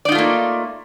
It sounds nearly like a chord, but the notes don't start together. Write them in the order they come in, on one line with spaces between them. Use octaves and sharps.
D5 D#4 F4 A3 A#3